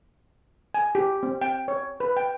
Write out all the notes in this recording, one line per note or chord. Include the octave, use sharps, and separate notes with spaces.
G#5
G4
C4
G5
C#5
B4
G5